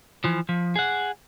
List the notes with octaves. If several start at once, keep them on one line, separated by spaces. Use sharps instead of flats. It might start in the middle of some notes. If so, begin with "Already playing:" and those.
E3 F3
F3
G#4 F#5